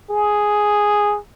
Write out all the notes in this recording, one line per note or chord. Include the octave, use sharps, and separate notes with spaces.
G#4